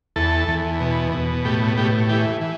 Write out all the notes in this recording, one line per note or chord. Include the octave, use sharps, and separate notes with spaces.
E2 A4
E2
B2
B2
A2 G4
A2 G4
E3 G4
E3